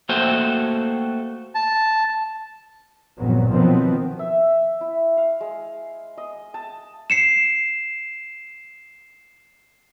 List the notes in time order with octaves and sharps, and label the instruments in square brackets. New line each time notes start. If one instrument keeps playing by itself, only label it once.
[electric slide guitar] A3 A#3 F#4 A4 C5 G5
[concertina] A5
[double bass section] G1 F2 A#2 F#3 B3
B2 D#3 F3 F#3 B3 C4
[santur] E5
E4
F5
G#3
D#5
A5
[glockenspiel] C7 C#7 E7